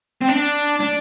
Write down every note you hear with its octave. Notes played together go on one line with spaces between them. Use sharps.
C4
D4
D4